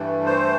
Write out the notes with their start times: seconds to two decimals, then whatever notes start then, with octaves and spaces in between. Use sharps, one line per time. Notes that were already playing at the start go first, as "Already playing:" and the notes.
Already playing: G2 E3 A3
0.25 C5